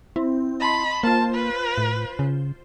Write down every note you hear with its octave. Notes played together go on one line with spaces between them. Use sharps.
C4 E4
D#5 A5 B5 C6
A#3 F4 C5 A5
B4
A2
C#3